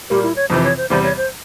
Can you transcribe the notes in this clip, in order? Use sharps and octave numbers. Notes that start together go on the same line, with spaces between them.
A#2 G3 A#3 G4
E4
C#5
F2 C3 E3 C5
C#5
C5
E2 C3 G3 C5
C#5
C5